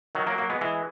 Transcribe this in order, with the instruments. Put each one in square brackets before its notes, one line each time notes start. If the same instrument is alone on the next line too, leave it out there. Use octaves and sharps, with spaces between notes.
[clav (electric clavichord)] D#3 F#3
F#3 A#3
F#3 A#3
G#3 B3
E3 G#3